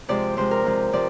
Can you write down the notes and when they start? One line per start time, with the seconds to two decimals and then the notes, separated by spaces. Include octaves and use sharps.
0.09 C3 F3 G#3 D5
0.37 C3 F3 G#3 C5
0.51 A#4
0.65 C3 F3 G#3
0.93 C3 F3 D5